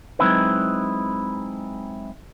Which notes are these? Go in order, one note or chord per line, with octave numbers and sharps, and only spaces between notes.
F#3 G#3 C4 D#4 E4 B4